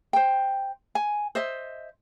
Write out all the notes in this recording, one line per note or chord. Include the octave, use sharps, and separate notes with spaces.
C5 G5
G#5
C5 D#5 E5